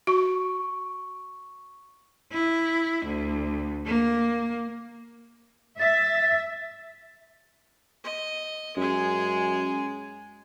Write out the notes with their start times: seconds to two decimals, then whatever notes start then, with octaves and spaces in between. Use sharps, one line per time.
0.07 F#4 C#6
2.33 E4
3.06 D2
3.86 A#3
5.79 E5 A6
8.04 D#5
8.77 F#2 G#3 G#4